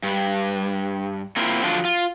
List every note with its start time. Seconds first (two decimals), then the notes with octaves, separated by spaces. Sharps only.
0.03 G2
1.36 A3 A#3 C4 E4 F4
1.63 D3 F3 F#3 D4 F4
1.85 F4